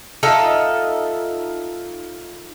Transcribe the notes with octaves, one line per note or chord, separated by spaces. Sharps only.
D#4 F4 A4 E5